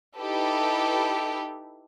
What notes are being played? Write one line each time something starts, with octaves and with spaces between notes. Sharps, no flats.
D#4 E4 G4 A4 B4